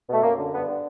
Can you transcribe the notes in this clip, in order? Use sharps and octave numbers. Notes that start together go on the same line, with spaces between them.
B2 A3
F#2 A#3
D3
G2 B3
D3